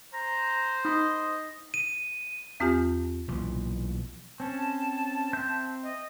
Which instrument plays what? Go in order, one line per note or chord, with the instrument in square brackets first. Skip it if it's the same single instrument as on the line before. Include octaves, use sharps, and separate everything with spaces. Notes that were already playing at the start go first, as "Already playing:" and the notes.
[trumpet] C5 [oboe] A#5
[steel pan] D#4 B5 [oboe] D#5
[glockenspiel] D#7
[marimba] E2 C4 F4 G4 G#5 G6
[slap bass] B1 A#2 E3 F3
[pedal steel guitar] C4 C#4 [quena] A5
[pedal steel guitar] C4 E5 G6
[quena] D#5